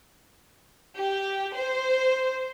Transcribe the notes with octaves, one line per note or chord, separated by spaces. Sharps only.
G4
C5